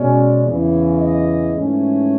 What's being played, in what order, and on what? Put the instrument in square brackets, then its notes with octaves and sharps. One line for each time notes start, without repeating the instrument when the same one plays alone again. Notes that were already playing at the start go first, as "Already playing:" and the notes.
Already playing: [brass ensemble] B2 G#3 C#4 D5
E2 C#3 E3
D#5
G#2 E3 A3 C#4